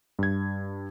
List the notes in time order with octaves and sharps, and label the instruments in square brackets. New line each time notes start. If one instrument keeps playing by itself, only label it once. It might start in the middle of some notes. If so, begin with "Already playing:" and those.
[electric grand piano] G2 G#6